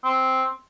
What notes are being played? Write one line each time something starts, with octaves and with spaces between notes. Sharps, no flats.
C4